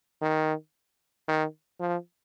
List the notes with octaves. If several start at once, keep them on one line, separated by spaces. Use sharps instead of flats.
D#3
D#3
F3